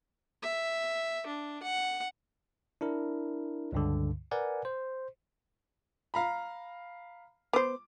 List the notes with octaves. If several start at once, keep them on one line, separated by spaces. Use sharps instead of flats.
E5
D4
F#5
D4 E4 A#4
C#2 G2 D3
A#4 B4 D5 F#5 G#5
C5
F5 A#5 B5
B3 C5 D6